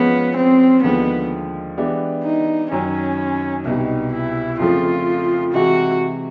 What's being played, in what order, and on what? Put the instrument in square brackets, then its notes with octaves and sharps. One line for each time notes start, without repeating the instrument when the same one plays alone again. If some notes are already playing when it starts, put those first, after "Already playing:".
Already playing: [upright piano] F3 G#3 C#4 [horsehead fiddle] B3
[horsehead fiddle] C4
[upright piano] D#2 D3 F3 G#3 [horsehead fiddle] B3
[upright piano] E3 G#3 B3 D4 G4
[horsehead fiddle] D#4
[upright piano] F#2 D#3 F#3 [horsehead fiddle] C#4
[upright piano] C2 B2 G3 [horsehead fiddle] D#4
[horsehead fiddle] E4
[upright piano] F2 C#3 F3 A3 [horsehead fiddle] F4
[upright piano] C3 E3 G#3 [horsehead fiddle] F#4